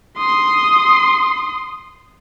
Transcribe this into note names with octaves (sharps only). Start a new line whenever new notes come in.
C6 D#6